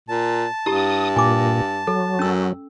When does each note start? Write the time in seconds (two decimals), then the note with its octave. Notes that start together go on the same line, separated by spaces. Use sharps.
0.09 A#2 A5
0.66 G2 E4 G4 D#6
1.16 A#2 G#5 D6
1.87 F#3 A4
2.19 F#2 C#4 E6